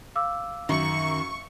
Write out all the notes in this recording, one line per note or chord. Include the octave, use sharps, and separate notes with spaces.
F5 D6 E6
F#2 D#3 C#6